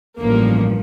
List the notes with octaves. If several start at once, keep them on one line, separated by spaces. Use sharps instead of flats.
A1 G2 F3 A#3